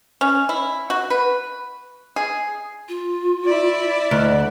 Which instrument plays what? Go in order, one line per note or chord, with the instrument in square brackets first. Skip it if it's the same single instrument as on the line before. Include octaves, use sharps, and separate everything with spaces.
[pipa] C#4
E4
F#4
B4
G#4
[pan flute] F4
[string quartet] E4 D5
[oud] D2 [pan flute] D#5